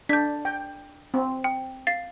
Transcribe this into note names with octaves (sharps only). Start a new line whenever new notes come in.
D4 G6 B6
G5
C4
G5
F5 A6 C7